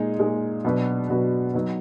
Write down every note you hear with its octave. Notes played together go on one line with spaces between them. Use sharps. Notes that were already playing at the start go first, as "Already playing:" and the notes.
Already playing: A#2 G#3 D#4 G#4
A#2 G#3 D#4 G#4
B2 F#3 D4 F#4 B4
B2 F#3 D4 F#4 B4
F#3 B3 D#4